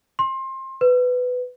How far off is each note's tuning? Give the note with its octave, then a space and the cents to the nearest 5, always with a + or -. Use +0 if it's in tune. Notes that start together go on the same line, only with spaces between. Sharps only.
C6 +25
B4 +15